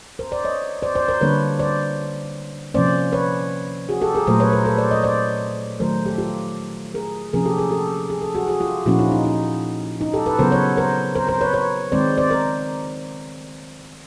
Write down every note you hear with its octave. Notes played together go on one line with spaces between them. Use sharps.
A#4 C5
C5 D5
C#5 D#5
C5 D5
C5 D5
A#4 C5
D3 G3 A#3 D4 B4 C#5
C5 D5
C3 F3 A#3 C#4 C5 D5
B4 C#5
F#4 G#4
G4 A4
G#4 A#4
A#2 F#3 A3 A#4 C5
B4 C#5
A#4 C5
A4 B4
C5 D5
C#5 D#5
C5 D5
D#3 F#3 A3 A#4 C5
G4 A4
F4 G4
G#4 A#4
C3 F3 A#3 C#4 G#4 A#4
G4 A4
G#4 A#4
G4 A4
G#4
A4
F#4 G#4
F#4 G#4
F4 G4
A#2 F3 A#3 C#4 E4 F#4
D#4 F4
D#4
D#4
D#4
G4 A4
A4 B4
C#3 F#3 B3 A#4 C5
B4 C#5
A#4 C5
A#4 C5
A#4 C5
B4 C#5
B4 C#5
D#3 G#3 C4 C5 D5
C5 D5
A#4 C5